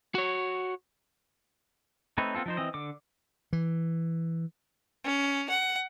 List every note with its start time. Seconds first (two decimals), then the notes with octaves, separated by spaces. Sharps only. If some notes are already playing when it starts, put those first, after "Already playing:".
0.15 F#4 C#5
2.18 A3 C4 D#4 B4 C#5
2.35 B3 C4 F4 A4
2.46 F3 D#4 C5
2.57 E3 C4 D#5
2.74 D3 D6
3.53 E3
5.04 C#4
5.49 F#5